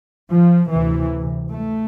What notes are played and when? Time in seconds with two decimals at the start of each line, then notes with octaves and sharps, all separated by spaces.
0.29 F3
0.70 D2 C3 E3
1.49 A3